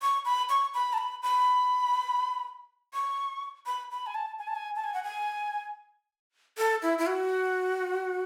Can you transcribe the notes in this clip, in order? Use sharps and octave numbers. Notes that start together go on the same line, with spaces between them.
C#6
B5
C#6
B5
A5
B5
B5
C#6
B5
B5
G#5
A5
G#5
A5
G#5
A5
G#5
F#5
G#5
A4
E4
E4
F#4